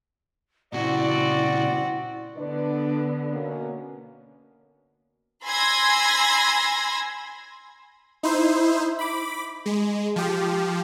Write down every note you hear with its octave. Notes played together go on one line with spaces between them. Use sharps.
A#2 C#3 C4 E4 F#4 D5
D3 B3 D4 B4 D5
B2 A#3 C#4
G#5 B5 C6 E6 G#6 A#6
D#4 E4 C5
B5 D6
G#3
F3 G4